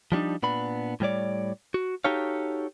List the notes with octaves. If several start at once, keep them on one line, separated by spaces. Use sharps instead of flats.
F3 G3 D4 D#4
A#2 B3 D4 B5
A2 G3 C#5 D5
F#4
D#4 F#4 G4 A4 C#5 F5